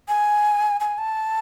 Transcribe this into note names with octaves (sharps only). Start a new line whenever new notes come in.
G#5
G#5
A5